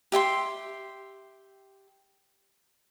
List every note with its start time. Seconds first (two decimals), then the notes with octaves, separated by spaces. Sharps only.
0.12 G4 E5 G5 C6